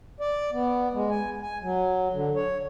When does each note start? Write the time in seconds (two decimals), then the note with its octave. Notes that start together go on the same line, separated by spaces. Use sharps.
0.21 D5
0.52 B3
0.93 G#3
1.11 G#5
1.42 G#5
1.62 F#3
2.13 D3
2.35 C#5